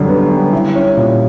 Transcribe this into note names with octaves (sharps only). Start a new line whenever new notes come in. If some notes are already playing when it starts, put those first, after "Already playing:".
Already playing: F#2 D3 G3
B3
G3
E4
C#4
A#2